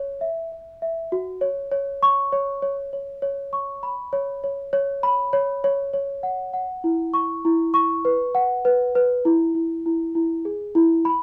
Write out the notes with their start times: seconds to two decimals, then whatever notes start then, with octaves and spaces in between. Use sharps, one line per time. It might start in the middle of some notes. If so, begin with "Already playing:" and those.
Already playing: C#5
0.21 E5
0.52 E5
0.82 E5
1.12 F#4
1.41 C#5
1.71 C#5
2.03 C#6
2.32 C#5
2.62 C#5
2.93 C#5
3.22 C#5
3.53 C#6
3.83 B5
4.13 C#5
4.44 C#5
4.73 C#5
5.03 B5
5.33 C#5
5.64 C#5
5.93 C#5
6.23 F#5
6.53 F#5
6.84 E4
7.14 C#6
7.45 E4
7.74 C#6
8.05 B4
8.35 F#5
8.65 B4
8.95 B4
9.25 E4
9.55 E4
9.86 E4
10.15 E4
10.45 G#4
10.75 E4
11.05 B5